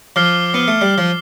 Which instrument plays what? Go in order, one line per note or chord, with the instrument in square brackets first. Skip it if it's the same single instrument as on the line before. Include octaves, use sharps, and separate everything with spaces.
[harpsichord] F3 [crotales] D6 F6 C7 G7
[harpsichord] B3
A3
G3
F3